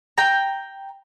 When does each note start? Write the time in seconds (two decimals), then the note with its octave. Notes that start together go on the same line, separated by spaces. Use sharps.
0.18 G5 A#5